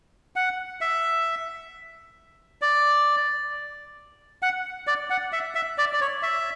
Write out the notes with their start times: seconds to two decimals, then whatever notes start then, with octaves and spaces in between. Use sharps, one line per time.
0.36 F#5
0.81 E5
2.62 D5
4.42 F#5
4.87 D5
5.10 F#5
5.32 E5
5.55 E5
5.78 D5
5.93 D5
6.01 C#5
6.23 E5